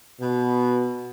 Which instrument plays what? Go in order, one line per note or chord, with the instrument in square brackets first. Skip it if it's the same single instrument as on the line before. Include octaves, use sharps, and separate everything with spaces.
[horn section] B2